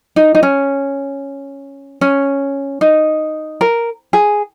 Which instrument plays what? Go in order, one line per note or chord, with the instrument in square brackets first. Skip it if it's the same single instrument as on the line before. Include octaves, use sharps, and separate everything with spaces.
[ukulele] D#4
D#4
C#4
C#4
D#4
A#4
G#4